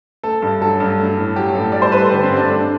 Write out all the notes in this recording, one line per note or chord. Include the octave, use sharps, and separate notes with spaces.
A3 A4
G2
F#3 A4
G2
A3
A2
F#3 G4
A2 A4
G3 D5
C5
G2 B4
A4
D3 G4
C4
G2
D4
A3 D4